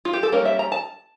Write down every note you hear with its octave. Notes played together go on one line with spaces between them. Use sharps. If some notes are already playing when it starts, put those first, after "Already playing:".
F4
G4
A4
G3 A#3 C#4 A#4
E5
A#5
A5